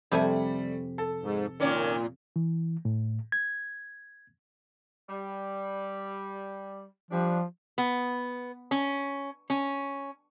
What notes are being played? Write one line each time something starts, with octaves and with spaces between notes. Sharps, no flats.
F2 C3 G3 A3 G#5
A4
G#2
A#2 D#3 C#4 D5
E3
A2
G#6
G3
F3 G3 D4
B3
C#4
C#4